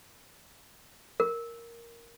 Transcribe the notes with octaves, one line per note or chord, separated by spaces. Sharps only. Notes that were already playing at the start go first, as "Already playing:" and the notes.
A#4